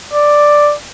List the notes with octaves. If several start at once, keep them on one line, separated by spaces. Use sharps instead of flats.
D5